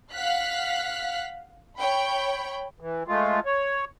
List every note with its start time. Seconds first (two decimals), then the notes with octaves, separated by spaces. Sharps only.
0.13 F5 F#5 F6 F#6 B6
1.78 C#5 G5 B5
2.80 E3
3.08 G#3 A3 F4
3.46 C#5